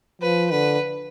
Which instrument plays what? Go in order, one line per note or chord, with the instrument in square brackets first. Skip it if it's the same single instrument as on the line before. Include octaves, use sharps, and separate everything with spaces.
[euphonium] F3 [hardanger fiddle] B4
[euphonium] D3 [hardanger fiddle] B4